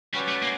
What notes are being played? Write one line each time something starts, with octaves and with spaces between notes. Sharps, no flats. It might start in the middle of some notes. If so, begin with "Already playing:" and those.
G3 C#4 F#4 B4 D5
A3
A#3